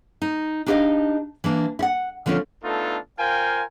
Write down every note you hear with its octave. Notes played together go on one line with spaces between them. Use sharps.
D#4
D4 D#4 G4 D5 D#5 F5
E3 A#3 D4
E4 F#5
D3 F3 C4 C#4 F4
A3 B3 D4 D#4 F4 A4
F4 A#4 C5 F5 G5 G#5